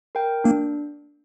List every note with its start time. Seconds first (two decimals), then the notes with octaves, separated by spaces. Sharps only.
0.15 A#4 G5
0.44 A#3 D4